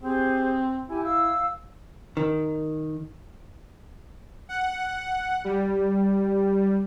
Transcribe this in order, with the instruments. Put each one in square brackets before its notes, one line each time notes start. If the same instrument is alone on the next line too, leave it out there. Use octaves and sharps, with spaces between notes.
[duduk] C4 [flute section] G4 G#4 C5
[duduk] E4 [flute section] G4 G#5
[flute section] F5 E6
[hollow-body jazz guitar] D#3
[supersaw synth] F#5
G3